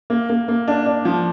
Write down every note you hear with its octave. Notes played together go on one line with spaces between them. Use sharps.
A#3
A#3
A#3
D4
D4
F3